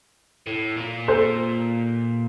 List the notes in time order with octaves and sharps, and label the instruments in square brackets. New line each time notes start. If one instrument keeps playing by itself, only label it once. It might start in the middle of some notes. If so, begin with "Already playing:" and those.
[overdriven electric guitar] A2
A#2
[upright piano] A4 C5